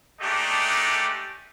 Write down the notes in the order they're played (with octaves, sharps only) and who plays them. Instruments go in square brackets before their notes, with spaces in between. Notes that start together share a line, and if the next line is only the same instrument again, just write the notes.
[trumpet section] G#3 A3 D4 D#4 G4